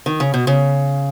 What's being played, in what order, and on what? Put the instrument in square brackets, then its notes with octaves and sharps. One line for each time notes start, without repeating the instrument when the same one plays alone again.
[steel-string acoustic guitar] D#3
C#3
B2
C#3